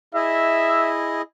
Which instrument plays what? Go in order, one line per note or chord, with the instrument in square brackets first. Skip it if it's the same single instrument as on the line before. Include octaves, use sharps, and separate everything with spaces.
[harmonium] E4 G#4 D#5 [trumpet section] E5